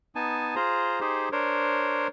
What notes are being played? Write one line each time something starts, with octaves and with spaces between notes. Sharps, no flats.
B3 D#4 G#5 A5
F4 G#4 C5 A#5
D#4 G4 G#4 C5
D4 A#4 C5 C#5